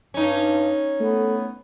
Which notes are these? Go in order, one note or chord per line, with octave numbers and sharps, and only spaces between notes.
G2 C#4 D#4
A3 B3